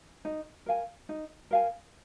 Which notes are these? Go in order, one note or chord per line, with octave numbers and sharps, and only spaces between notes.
D#4
A#4 F5 G#5
D#4
A#4 F5 G#5